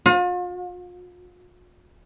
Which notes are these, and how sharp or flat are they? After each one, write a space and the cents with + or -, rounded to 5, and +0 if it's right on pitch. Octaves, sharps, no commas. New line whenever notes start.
F4 +40